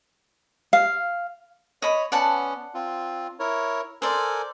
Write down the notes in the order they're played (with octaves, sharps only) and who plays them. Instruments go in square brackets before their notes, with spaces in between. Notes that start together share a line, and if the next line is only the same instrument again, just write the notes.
[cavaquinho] F5
[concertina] C#5 [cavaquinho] D#5 B5
[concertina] B3 C#4 [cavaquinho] D5 F#5 A5
[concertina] C4 F4
E4 A#4 C#5
[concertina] A4 A#4 G#5 [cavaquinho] C5 D5